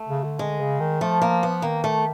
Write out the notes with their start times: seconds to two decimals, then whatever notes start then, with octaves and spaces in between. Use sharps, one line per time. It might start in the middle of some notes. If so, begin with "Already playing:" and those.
Already playing: A3
0.09 C#3
0.24 D3
0.39 D3 G#3
0.60 C#3
0.80 D#3
1.01 F3 A3
1.22 A#3
1.43 B3
1.62 D#3 A#3
1.84 A3